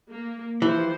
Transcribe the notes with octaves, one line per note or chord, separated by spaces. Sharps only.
A#3
E3 F3 G4 C5